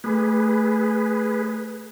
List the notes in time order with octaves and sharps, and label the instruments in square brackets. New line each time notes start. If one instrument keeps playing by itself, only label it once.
[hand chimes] A3 [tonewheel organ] G#4 B4